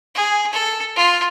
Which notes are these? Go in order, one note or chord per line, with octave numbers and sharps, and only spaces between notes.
G#4
A4
F4